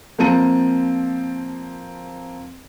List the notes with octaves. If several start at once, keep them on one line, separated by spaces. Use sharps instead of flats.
F3 A#3 C4 A5 D#7